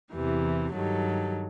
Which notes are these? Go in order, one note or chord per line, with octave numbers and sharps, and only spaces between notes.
E2 C3 E3 G4
G2 D#3 F#3 G4 A4